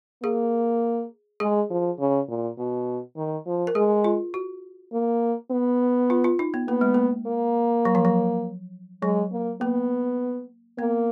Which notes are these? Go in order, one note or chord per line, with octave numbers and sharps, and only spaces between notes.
A#3 G#4
G#3 G#4
F3
C#3
A#2
B2
D#3
F3
A#4
G#3 G#4
F4
F#4
A#3
B3
F4
F4
D#4
B3
A#3 B3
G#3
A#3
A#3
F#3
F3
F#3
F#3 G#3
A#3
A#3 B3
A#3 B3